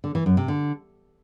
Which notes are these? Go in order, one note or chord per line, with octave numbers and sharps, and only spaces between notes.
D3
E3
F#2
C3
D3